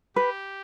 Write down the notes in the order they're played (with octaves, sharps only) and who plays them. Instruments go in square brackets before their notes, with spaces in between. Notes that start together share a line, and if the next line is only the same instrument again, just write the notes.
[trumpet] G4 [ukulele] B4